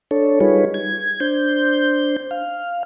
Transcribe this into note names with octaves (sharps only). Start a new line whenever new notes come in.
D4 A4 C#5
G3 D#4 F4 G#4 B4 C#5
G#6
D4 C5 G6
F5